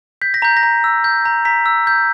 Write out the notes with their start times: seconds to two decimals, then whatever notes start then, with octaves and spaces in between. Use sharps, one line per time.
0.22 G6 B6
0.34 A#6
0.42 A#5 G6
0.57 A#6
0.63 A#5
0.84 E6
1.04 G6
1.25 A#5
1.45 A#5 B6
1.66 E6
1.87 G6